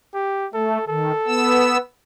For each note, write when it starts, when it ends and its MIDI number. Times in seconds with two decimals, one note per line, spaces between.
0.15 0.47 67
0.54 0.78 57
0.54 0.86 69
0.88 1.12 51
0.88 1.76 69
1.27 1.77 59
1.27 1.77 88